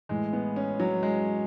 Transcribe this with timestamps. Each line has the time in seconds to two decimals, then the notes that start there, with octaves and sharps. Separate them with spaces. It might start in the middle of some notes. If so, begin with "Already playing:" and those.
0.09 A2 E3 G#3
0.33 B3
0.56 C#4
0.80 F#3
1.03 G#3